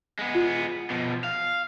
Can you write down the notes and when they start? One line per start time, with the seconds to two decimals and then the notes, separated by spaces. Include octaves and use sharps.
0.19 G#3 B3
0.35 F4
0.90 B2 F3
1.24 F5